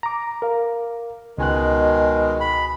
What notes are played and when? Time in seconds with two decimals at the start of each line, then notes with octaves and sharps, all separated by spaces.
0.03 A#5 D6
0.42 A#4 F5
1.38 C#2 B2 D#3 G#3 G#5 F#6
2.40 B5